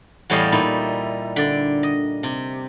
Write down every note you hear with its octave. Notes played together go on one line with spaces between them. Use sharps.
E2 A2 G3 C#5 D#5 F5
A#2 D#4 E4
D3 D5
D#5
C3